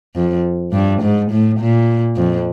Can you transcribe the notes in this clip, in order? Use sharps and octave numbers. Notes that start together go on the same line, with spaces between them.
F2
G2
G#2
A2
A#2
F2